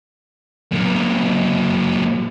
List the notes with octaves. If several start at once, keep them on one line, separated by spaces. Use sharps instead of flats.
A#2 F#3